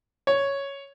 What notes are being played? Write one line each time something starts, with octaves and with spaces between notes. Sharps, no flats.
C#5